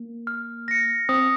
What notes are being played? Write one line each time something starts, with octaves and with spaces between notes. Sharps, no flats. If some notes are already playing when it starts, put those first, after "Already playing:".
Already playing: A#3
F6
A#6 C#7
C4 D#6